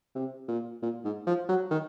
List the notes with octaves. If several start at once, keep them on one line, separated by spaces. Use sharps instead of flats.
C3
A#2
A#2
G#2
F3
F#3
D#3